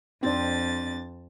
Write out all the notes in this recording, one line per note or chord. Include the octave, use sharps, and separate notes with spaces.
F2 C4 D4 A6